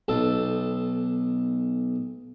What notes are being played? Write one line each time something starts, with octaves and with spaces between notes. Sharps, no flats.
B1 A4